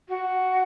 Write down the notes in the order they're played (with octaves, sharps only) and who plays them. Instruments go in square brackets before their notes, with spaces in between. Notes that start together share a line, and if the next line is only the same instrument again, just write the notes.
[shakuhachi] F#4